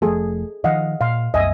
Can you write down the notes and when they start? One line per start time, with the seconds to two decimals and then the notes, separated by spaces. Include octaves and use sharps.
0.02 F1 F3 A3 G#4 A4
0.64 D#3 F3 D#5 F5 F#5
1.01 A#2 F5 C6
1.34 C2 F#2 D#5 E5 G#5